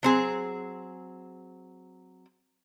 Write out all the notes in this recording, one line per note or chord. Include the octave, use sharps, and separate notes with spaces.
F#3 C4 G#4